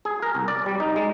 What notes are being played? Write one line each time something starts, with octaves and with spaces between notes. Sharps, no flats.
G#4
A#4
C2
D5
G3
D#4
G#3